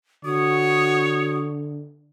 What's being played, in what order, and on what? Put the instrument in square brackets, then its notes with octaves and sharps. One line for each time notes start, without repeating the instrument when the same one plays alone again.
[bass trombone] D3 [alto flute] F#4 [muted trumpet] C#5 [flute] D#6